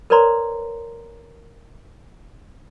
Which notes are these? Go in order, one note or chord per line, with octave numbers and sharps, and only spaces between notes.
A#4 B4 C#5 D5 A#5 C6